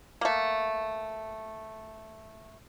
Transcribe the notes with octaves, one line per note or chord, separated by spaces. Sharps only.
A3 A#3